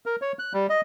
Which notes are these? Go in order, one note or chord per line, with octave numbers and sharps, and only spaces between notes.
A#4
C#5
F#6
G3
D#5